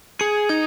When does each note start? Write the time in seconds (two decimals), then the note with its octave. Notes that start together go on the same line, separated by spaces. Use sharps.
0.20 G#4 G#6 C#7
0.49 D#4 D#6 G#6